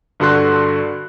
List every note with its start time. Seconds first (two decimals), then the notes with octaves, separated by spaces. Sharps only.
0.20 G2 D3 F#4 A4 C6 F#6